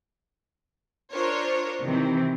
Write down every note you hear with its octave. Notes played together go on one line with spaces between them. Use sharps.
D4 F4 A#4 C5 C#5
C3 D#3 E3 C4